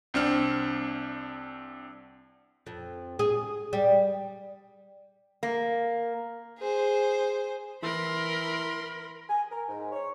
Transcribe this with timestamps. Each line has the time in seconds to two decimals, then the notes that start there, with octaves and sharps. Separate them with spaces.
0.14 C2 C4 D4 F6
2.67 F2
3.19 G#4
3.73 G3
5.43 A#3
6.59 G#4 C5
7.83 E3 A#4 B5 C6
9.29 G#5
9.51 A#4
9.69 G#2
9.92 C#5